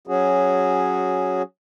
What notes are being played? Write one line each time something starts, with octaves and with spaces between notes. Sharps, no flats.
F#3 C#4 F#4 G#4